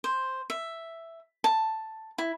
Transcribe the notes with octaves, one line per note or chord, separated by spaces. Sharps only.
C5
E5
A5
E4